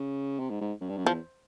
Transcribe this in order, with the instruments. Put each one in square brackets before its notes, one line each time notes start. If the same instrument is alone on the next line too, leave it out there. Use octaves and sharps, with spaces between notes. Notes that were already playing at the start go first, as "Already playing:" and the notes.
Already playing: [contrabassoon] C#3
C3
G#2
G#2
F#2
G2
F#2
[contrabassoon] E2 [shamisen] F3